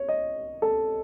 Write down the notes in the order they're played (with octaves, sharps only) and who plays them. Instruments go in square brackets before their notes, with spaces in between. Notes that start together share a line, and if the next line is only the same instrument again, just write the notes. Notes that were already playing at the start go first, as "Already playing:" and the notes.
Already playing: [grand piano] C#5
D#5
A4